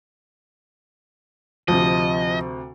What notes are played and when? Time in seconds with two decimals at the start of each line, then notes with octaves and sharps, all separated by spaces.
1.68 D2 C3 F3 D#5